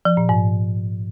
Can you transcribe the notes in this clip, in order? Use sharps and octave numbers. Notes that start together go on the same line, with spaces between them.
F3
A#2
G#2